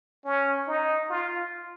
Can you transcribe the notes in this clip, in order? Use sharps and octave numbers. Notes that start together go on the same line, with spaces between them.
C#4
D#4
F4